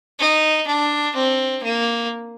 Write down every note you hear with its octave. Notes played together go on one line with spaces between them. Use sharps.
D#4
D4
C4
A#3